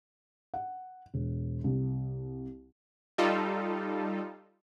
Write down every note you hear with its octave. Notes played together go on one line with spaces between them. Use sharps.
F#5
E1
C2
G3 D#4 F4 A4